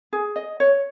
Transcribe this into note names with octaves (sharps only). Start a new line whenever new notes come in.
G#4
D#5
C#5